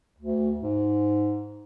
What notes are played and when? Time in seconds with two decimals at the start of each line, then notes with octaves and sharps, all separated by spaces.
0.18 D2
0.59 G#2